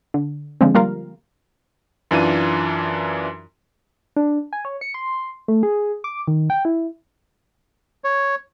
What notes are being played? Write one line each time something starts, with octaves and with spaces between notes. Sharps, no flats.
D3
D3 F3 G#3 C4
G3 A#3 F4 A#4 F5
F#2 E3 D4 F4 D#7
D4
G#5
C#5
C#7
C6
A3
G#4
D6
D#3
G5
E4
C#5